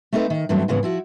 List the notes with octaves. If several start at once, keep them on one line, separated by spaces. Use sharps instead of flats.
A3 C4 D#4 G#4 A4 B4
D#3
G2 E3 F#3 A3 C4
G#2 C#3 E3 B3
F3 E4 F#4